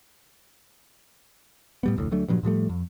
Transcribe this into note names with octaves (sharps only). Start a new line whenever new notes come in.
A2 G3 B3
F1 D2 A2
D2 F#3 A3 D4
G2 A#2 F3 F#3
A2 F3 G3 A3
F2